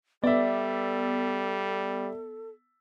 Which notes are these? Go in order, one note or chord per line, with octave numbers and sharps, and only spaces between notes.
G3 B3 A4 D5 E5